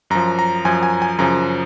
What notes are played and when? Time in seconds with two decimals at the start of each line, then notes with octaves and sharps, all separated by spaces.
0.10 F#2 F3 A#5
0.39 A#5
0.65 F#2 F3 G#5
0.83 G#5
1.02 G#5
1.19 F#2 C#3 F3 A#5